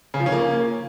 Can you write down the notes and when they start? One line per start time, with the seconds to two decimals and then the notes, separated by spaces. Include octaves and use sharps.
0.14 C#3
0.20 F3
0.26 C#4
0.32 A#3